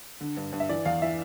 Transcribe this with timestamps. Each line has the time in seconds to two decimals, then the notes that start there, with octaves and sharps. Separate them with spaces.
0.21 D3
0.37 G2
0.53 G2
0.60 E5
0.69 E3 D5
0.85 E2 F5
1.02 E3 E5